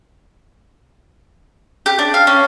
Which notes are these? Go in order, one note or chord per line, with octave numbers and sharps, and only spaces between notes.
G4
D4
F5
C#4